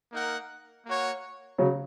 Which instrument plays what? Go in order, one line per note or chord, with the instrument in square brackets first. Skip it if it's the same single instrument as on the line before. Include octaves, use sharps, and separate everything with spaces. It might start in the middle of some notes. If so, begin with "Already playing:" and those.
[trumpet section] A#3 D#4 A#4 F#5
A#3 F#4 C#5 F#5
[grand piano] C#3 F#3